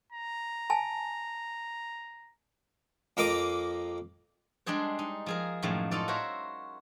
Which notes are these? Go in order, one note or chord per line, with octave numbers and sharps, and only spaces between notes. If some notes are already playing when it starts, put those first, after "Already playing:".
A#5
G#5 A5
F2 A#3 A#4 D#5 D6 D#6
G3 G#3 D4 G#4 C5
D#4
F3 G#4 A#4
F#2 A2 D#3 F3 G#3
C#4 D#4 F4 A4 D5
F#4 A#4 C5 C#5 E5